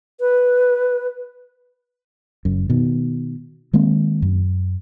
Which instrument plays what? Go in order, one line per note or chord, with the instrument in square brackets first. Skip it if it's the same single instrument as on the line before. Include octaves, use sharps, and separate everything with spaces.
[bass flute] B4
[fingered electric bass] F#1 F#2
B2 D#3
D#3 G#3 A#3 C4
F#2